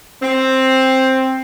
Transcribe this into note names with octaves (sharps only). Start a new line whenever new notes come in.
C4